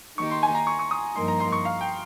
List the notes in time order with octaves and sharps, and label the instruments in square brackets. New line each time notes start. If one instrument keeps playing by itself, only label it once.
[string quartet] D#3 A#3 D#4 G4 [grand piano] C#6
[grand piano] C6
G#5
A#5
C#6
C#6
D#6
[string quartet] G2 F3 A#3 D#4 A#4 [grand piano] C6
[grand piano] A#5
C6
C#6
F5
G5